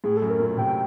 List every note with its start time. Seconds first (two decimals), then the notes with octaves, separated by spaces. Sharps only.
0.04 A2 G#4
0.17 F#2 A4
0.30 A#4
0.40 A#2
0.58 C3 G5